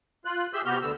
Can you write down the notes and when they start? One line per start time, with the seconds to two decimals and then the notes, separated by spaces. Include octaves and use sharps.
0.25 F4 F#6
0.54 G4 G#4 E5 E6 G6
0.65 C3 B3 F#4 G4 F6 G6
0.82 D2 D3 B3 E6